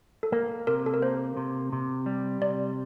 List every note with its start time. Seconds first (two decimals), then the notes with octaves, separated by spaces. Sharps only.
0.23 A4
0.32 A#3 A#4
0.67 C3 A#4
0.86 A4
0.94 A#4
1.02 A#3 C5
1.37 C3
1.72 C3
2.06 G3
2.42 C3 D5